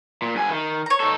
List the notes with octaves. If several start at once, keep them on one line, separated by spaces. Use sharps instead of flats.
A#2
G2 G#5
D#3
C#5 A#5
D#4 A4